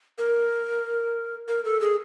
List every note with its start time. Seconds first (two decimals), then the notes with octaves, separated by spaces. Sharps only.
0.18 A#4
1.48 A#4
1.65 A4
1.81 G#4